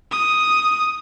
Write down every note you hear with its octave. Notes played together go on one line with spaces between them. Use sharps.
D#6